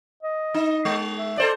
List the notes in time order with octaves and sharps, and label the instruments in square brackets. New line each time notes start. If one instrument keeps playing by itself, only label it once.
[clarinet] D#5
[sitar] D#4
G#3
[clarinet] E5
[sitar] A4 C5 D5